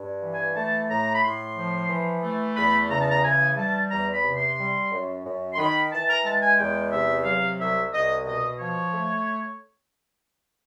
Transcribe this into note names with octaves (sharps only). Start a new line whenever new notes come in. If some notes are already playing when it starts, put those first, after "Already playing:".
Already playing: G2
E3
G#5
A3 A5
A2 A#5
B5
A2 C6
F3
E3
A3
E2 B5
C#3 A#5
A5
A#5
E3 G#5
G3 A5
E2 A#5
B5
C3
C6
G3
F#2
F#2
C6
D#3 B5
E3 A5
A#5
G#3 A5
G#5
E2 G5
C3 E5
F#3 F5
C2 E5
C2 D#5
B2 D#5
F3 C#5
A3